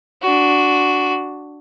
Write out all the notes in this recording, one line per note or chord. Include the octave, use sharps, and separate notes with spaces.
D4 F#4